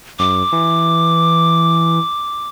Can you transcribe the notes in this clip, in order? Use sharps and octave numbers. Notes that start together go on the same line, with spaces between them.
F#2 D6
E3